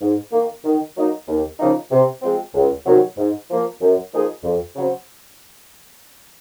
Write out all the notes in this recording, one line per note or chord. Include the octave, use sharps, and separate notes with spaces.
G#2
D#3 A#3
D#3
F#3 A#3 D#4
D#2
C#3 F3 A#3 D#4
C3
F3 G#3 C4
C#2
C3 D#3 F#3
G#2
F3 A#3
F#2
F3 A#3 D#4 G#4
F2
C#3 F#3 C4